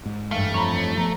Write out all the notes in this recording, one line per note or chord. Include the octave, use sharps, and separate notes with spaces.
G#2
G2 E3 A3 F5 F6
F2 C#5 A#5 B5
F3 B3 A#5